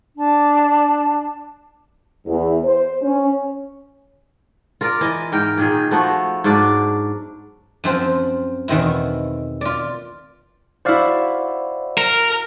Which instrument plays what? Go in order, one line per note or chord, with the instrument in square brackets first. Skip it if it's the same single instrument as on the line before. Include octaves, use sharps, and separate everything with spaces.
[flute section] D4 A5
[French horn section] E2
C5
C#4
[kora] F4 A#4 D5
E3 D#5
G#2 A#4 G5
A#2 D#3 G#4
F3 A3 B3 F#4
G#2 F#3 D4 D5
[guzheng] F#2 F3 C4 C5
E2 B2 D#3 C4 E4
F4 D5
[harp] E4 F#4 [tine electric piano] C5 D5 F5
[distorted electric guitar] A#4